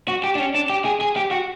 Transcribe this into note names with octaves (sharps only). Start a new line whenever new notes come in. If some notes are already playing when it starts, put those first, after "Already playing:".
F#4
G4
D4
C#4
D4
G4
G#4
G#4
G4
F#4